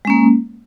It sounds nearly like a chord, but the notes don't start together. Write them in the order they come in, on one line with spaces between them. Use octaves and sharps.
G#3 C#4 A#3